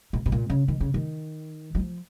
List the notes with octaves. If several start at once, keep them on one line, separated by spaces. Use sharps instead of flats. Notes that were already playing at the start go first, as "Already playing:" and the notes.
A#2
B2
A#2
C#3
D#3
C#3
D#3
F#3
F3